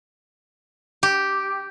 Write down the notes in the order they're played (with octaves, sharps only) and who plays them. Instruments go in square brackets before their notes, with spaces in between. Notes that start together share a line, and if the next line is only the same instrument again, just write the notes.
[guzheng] G4